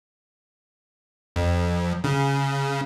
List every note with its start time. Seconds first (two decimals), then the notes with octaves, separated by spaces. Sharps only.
1.36 F2
2.04 C#3